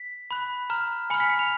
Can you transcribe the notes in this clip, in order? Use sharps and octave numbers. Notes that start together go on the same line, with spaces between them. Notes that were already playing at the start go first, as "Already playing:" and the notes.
Already playing: B6
B5 F#6
A#5 F6
G#5 B5 F6 C#7
B6
C#7
F7